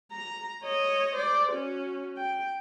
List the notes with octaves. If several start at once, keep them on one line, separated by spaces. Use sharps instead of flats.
A#5
C#5 D#5
C5 D5
C#4 F#4
G5